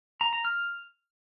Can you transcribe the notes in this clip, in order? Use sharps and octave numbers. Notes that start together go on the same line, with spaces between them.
A#5
A#5
F6